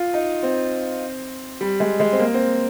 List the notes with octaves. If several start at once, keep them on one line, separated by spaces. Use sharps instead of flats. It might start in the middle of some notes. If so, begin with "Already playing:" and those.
Already playing: F4
D#4
C4
G3
G#3
G#3
C4
A#3
C4